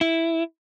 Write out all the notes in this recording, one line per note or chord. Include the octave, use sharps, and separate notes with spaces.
E4